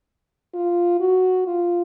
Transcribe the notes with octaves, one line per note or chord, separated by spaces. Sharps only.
F4
F#4
F4